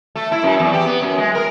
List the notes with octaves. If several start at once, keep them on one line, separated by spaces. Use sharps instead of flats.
A3
E4
F#2
E2
G4
B3
F#2
G#3
A#4